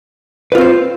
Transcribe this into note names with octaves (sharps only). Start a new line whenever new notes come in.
C4 F4 B4 C5